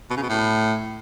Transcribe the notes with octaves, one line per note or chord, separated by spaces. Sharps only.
B2
C#3
B2
A2